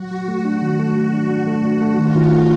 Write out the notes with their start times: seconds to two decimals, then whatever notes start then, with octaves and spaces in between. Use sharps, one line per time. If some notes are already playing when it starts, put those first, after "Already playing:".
Already playing: F#3 F#4
0.11 F#3
0.28 A3
0.45 D4
0.62 D#3
0.79 A3
0.96 F#3
1.13 D4
1.30 D4
1.47 A3
1.65 D4
1.81 A3
1.98 D#3 F4
2.15 D#3
2.32 A3